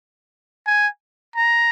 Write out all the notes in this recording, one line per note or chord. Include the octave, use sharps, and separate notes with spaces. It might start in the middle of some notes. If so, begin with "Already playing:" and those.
G#5
A#5